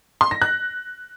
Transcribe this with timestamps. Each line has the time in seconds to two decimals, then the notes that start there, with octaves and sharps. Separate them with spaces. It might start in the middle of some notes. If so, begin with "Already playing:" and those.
0.21 C6
0.31 A#6
0.42 F#6